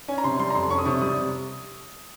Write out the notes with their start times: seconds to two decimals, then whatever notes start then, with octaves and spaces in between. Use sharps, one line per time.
0.08 C#4 G#5
0.18 A#5
0.24 C3 C6
0.39 G3 C6
0.50 A#5
0.55 F2 C6
0.70 C#4 C#6
0.78 D#6
0.85 C3 C#6
1.01 G3 D#6